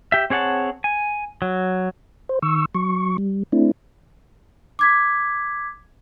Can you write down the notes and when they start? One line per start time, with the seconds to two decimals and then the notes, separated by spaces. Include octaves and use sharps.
0.12 G4 E5
0.30 C4 G#4 C#5 F#5 A5
0.84 G#5
1.42 F#3
2.29 C5
2.42 D#3 C#6 E6
2.75 F#3 C#6
3.18 G3
3.52 A3 C4 D4 E4
4.79 D6 G#6 B6